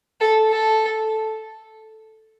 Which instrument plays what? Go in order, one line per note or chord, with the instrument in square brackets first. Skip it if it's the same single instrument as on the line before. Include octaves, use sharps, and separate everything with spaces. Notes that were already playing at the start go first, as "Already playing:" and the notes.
[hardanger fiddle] A4
A4